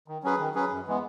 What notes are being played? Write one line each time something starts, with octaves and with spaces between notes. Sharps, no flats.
D#3
F#3 C#4 G#4 B4
D#3
F#3 C#4 G#4 B4
F#2
E3 G#3 B3